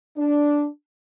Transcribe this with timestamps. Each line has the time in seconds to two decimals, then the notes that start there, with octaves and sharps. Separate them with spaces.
0.17 D4